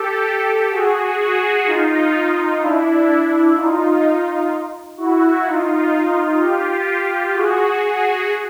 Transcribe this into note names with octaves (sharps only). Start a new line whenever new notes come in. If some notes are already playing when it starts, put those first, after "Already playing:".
Already playing: G4 A4
F#4 G#4
F#4 G#4
D#4 F4
D4 E4
D#4 F4
E4 F#4
D#4 F4
F4 G4
F#4 G#4
F#4 G#4